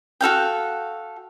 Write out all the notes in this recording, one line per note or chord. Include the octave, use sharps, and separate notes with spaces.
F#4 A4 F5 G5